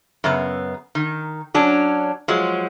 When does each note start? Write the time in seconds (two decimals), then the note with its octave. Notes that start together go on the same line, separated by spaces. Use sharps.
0.24 F#2 C#3 B3
0.95 D#3
1.54 F#3 C#4 D4
2.28 F3 F#3 G#3